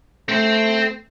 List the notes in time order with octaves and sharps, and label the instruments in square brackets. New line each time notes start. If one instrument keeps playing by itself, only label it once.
[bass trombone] A3 [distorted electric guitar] C4 C5